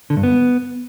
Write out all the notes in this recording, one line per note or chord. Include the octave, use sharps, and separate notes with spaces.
D3
G2
B3